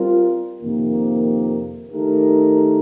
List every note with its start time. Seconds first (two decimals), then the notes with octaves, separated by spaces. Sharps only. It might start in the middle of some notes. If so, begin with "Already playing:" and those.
Already playing: G3 C4 F4 A#4
0.62 F2 C3 D#3 A#3
1.91 D#3 A3 D#4 G4 A#4